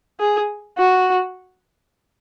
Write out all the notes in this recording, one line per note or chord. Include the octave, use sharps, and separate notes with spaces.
G#4
F#4